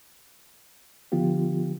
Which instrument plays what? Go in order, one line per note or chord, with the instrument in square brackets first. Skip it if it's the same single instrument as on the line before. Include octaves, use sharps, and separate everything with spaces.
[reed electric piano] D3 F3 B3 F4 G4